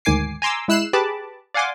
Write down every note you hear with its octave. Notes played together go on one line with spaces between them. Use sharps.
D2 G#2 D#3 G#5 D6 C7
G#5 A#5 C6 D6 E6
G#3 E4 E6 F#6 C7 E7
G4 G#4 B4 A5 B5 D6
D5 F5 F#5 G#5 C6 D6